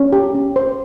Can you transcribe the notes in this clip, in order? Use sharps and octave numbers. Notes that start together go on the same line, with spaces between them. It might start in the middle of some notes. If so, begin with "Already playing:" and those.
Already playing: C#4
G4
C#4
C5